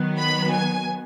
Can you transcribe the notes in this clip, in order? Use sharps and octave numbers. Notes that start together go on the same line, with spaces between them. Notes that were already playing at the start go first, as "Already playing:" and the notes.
Already playing: D#3 F#3 B3
B5
G#5